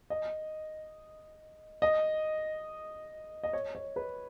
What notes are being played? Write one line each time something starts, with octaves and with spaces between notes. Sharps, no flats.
D#5
D#5
D#5
C#5
C#5
B4